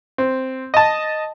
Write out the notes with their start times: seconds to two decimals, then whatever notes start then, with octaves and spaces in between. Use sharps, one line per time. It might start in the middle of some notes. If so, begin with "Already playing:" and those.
0.18 C4
0.74 D#5 A5